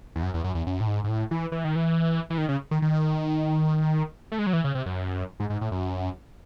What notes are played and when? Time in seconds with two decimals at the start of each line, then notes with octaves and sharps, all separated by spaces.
0.16 E2
0.23 F#2
0.34 E2
0.44 F#2
0.55 E2
0.67 F#2
0.80 A2
0.87 G#2
1.04 G#2
1.09 A2
1.31 E3
1.52 E3
1.64 D#3
1.76 E3
2.30 E3
2.38 D#3
2.49 C#3
2.71 D#3
2.82 D#3
4.32 A3
4.39 G#3
4.47 F#3
4.53 E3
4.64 C#3
4.75 C3
4.86 F#2
5.40 G#2
5.50 G#2
5.61 A2
5.72 F#2